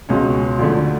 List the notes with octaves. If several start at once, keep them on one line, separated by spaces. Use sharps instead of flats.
C#2 B2 G#3 C#4
D2 D3 F3 A3